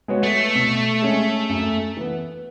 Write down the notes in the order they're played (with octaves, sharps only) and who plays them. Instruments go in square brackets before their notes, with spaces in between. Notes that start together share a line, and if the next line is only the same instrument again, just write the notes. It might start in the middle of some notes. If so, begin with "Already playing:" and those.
[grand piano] G#3 B3 F#4 C#5
[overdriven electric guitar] A3
[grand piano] B2
G#3 C#4 G#4
F#2
E3 B3